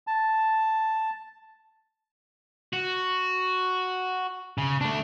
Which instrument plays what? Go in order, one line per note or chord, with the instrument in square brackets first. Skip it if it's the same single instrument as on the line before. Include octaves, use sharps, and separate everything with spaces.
[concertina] A5
[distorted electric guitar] F#4
C#3
A3 D4